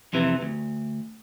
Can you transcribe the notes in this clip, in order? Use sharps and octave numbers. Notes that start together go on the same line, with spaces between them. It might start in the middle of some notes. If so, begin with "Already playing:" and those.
F2 C3 E3
D2